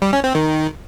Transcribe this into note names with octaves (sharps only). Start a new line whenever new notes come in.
G3
C#4
C4
D#3